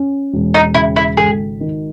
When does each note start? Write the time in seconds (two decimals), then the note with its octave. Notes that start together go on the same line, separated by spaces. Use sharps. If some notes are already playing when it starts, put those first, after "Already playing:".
Already playing: C#4
0.33 E1
0.54 D#4
0.74 C#3 E4
0.96 E4
1.17 G#1 G#4
1.60 D#3